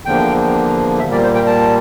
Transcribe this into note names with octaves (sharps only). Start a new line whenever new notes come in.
E2 D3 F3 A#3 G5
A#2 G3 A#3 E5
D5
C5
G5
A5